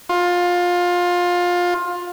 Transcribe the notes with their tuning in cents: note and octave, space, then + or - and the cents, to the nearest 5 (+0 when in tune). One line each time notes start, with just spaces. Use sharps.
F4 +20